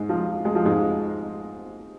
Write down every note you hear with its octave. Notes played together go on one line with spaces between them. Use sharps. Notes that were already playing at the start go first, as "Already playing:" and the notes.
Already playing: G#2 G#3
F3
G#3
F3
G#2 G#3